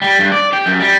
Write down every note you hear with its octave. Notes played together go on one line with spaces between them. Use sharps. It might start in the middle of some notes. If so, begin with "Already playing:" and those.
G3
G2
D5
G4
F#2
G3